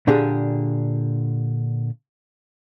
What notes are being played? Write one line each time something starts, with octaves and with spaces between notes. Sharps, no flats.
A#2 D3 D4 G4 G#4